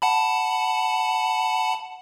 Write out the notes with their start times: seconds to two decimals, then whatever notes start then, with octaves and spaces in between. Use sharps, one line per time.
0.02 F#5 A5 B5